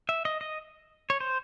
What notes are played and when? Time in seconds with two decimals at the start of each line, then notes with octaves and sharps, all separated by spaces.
0.09 E5
0.25 D#5
0.41 D#5
1.10 C#5
1.20 C5